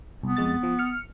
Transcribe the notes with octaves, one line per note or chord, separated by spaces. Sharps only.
C2 B3
F2 G#3 A6
F3
F6 C#7